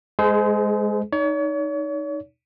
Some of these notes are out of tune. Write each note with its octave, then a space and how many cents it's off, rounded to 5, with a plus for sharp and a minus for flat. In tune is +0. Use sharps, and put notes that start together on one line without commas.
G#3 +0 G#4 +35 C5 -30
D#4 -5 C#5 +40